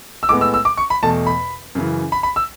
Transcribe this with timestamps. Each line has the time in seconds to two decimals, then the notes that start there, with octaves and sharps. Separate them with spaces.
0.23 E6
0.29 A2 G#3 B3 D6
0.41 E6
0.54 E6
0.65 D6
0.77 C#6
0.90 B5
1.03 E2 B2 A3 A5
1.26 B5
1.75 F#2 C#3 E3
2.12 B5
2.23 B5
2.36 E6